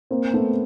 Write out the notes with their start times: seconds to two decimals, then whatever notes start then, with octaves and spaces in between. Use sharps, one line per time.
0.11 A#3 C4
0.34 A3 B3